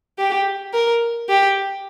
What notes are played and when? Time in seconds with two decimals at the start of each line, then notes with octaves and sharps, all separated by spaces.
0.19 G4
0.74 A#4
1.29 G4